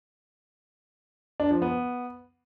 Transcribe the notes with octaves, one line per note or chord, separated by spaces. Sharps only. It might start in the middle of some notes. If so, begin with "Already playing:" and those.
D4
F3
B3